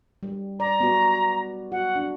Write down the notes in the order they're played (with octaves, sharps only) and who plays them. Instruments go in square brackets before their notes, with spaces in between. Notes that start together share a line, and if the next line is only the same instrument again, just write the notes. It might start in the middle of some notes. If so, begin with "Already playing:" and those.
[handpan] G3
[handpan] D5 [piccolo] A#5
[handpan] B3 F#4
[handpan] F#4 [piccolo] F#5
[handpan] D4